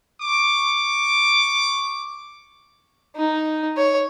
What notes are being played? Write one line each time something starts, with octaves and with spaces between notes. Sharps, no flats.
C#6 D6
D#4
C#5